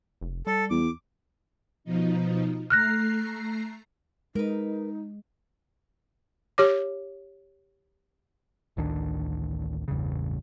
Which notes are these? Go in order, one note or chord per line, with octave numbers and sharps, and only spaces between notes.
F1
G3 A4
E2 D6
B2 F3 D#4
A3 A#5 F6 F#6 A#6 C7
G#3 D#4 A#4 B4
G4 C#5 D6
A1 D2 D#3 D4
A1 E2 G2 C#3